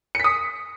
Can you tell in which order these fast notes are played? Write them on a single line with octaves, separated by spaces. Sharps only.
C#7 B6 D#6